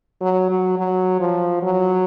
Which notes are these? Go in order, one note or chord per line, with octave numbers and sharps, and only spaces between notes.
F#3
F#3
F#3
F3
F#3